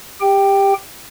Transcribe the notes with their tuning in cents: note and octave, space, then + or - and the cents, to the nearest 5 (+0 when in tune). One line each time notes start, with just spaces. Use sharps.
G4 +20 G5 +0